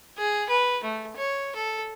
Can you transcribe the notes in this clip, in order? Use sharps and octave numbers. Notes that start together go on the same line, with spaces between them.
G#4
B4
A3
C#5
A4